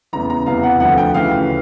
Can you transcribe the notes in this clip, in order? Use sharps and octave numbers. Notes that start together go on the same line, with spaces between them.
E2 C#3 E3 A#5
A#5
E2 C3 E3 F5
F#5
D2 D3 F3 F#5
G5
D2 C#3 E3 F5